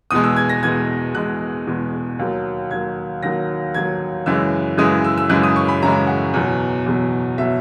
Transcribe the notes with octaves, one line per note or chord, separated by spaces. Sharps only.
E2 B2 G#3 D#6
E6
G#6
A#6
E2 B2 G#3 G#6
E2 B2 G#3 F#6
E2 B2 G#3
D#2 D#3 F#3
D#2 D#3 F#3 G#6
D#2 D#3 F#3 A#6
D#2 D#3 F#3 G#6
F#2 C#3 E3 G#3 E6
F#2 C#3 E3 G#3 D#6
E6
E6
F#2 C#3 E3 G#3 F#6
D#6
C#6
B5
F#2 C#3 E3 G#3 A#5
F#5
E2 B2 F#3
E2 B2 F#3
B2 F#3 E5